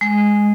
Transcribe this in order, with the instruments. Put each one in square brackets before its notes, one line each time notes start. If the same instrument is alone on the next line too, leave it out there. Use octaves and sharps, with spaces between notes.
[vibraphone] G#3